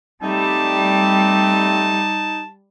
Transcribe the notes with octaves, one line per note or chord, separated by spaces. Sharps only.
G3 A3 C4 D#4 A5